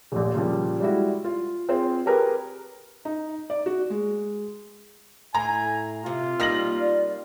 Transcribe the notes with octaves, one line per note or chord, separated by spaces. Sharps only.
D#1 A#1
A#2 C#3 F3 G3
G3 G#3 E4 F#4
F4
C4 F4 G#4 C5
G4 G#4 A#4 B4
D#4
D5
F#4
G#3
A2 G#5 A#5
C3 F4
G3 A#3 D#4 F6 A#6 F#7
D5